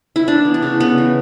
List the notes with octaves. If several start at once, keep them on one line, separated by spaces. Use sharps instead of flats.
E4
E3 D4
B3
D4
C#3
C#3 B3
E3